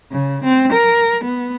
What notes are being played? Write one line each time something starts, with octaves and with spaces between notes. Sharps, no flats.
C#3
C4
A#4
B3